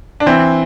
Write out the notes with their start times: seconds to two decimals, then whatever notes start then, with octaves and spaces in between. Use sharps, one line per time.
0.20 D4
0.26 E3 C4